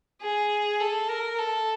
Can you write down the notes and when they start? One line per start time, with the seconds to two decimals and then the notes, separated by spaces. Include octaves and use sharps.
0.22 G#4
0.80 A4
1.09 A#4
1.39 A4